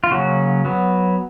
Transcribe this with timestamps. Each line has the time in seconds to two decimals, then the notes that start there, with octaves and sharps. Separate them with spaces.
0.04 F4
0.11 C#3 F#3 A#3 C#4 F#4
0.65 F#3 B3